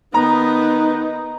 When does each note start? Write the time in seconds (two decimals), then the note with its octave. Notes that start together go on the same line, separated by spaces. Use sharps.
0.14 D#3 B3 D#4 A#5